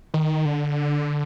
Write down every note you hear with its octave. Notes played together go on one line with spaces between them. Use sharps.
D#3
D3